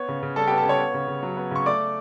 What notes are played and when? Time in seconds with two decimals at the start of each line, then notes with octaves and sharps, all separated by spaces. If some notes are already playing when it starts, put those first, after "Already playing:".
Already playing: B3 C#5 C#6
0.08 C#3
0.23 C#3
0.36 G3 A4 A5
0.47 B3 G4 G5
0.58 A4 A5
0.65 C#3 C#5 C#6
0.80 B3
0.94 C#3
1.08 C#3
1.23 F#3
1.37 B3
1.51 C#3 C#6
1.66 A3 D5 D6